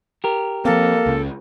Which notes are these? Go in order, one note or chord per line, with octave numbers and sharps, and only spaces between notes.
G4 A#4
F3 A#3 C4 A4
C#2 C#3